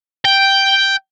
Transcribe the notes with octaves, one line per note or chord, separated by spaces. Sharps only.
G5